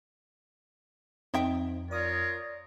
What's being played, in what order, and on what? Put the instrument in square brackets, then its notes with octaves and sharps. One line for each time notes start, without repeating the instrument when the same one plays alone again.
[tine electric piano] F2 [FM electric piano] C4 D#4 [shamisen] D#5 E5 G5
[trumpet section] F4 A#4 C#5 [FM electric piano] D5 D#6 A#6